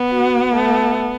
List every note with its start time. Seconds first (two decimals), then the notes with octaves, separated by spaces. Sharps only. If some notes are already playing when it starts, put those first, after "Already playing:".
Already playing: B3
0.10 F#4
0.54 A3